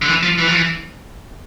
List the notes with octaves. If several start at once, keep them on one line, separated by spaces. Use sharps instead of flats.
D3
E3
F3
E3
F3
E3